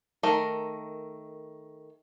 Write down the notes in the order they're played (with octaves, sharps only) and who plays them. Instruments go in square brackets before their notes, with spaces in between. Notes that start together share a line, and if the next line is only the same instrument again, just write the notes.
[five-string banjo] D#3 A3 A#4